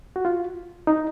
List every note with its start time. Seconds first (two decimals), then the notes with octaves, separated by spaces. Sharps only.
0.16 F#4
0.25 F4
0.87 D#4